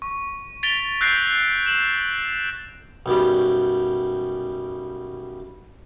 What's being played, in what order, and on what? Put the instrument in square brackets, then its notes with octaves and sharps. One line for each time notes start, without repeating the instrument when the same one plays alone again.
[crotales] C#6
A6 B6 D7 F7 G7
E6 F#6 G6 A#6 C7 D7
E7 F#7
[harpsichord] B1 F#2 G3